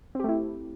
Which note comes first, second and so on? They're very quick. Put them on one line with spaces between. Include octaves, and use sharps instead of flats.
C4 G4 A3 E4